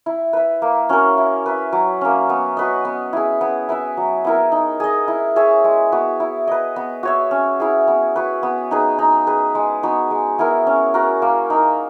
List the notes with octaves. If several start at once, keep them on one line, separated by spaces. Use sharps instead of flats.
E4
B4 E5
A#3
C#4 F#4 A#4
E4
B4 E5
F#3
A#3 C#4
B3
F#4 B4 D#5
B3
E4 G#4
B3
E4 B4 E5
F#3
B3 E4 A#4
D#4
G#4 D#5
E4
G#4 C#5 E5
G#3
B3 F#4
E4
B4 D#5
B3
F#4 C#5 E5
C#4
E4 G#4
B3
F#4 B4
B3
D#4 G#4 B4
D#4
G#4 B4
G#3
B3 D#4 F#4
G#3
B3 E4 A#4
C#4
F#4 A#4
A#3
D#4 A#4